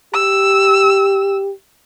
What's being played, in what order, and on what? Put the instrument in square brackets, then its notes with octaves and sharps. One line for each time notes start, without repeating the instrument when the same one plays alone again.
[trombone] G4 [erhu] E6